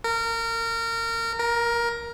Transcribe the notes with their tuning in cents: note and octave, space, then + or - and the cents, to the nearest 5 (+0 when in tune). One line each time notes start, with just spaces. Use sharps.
A#4 -25
A#4 +15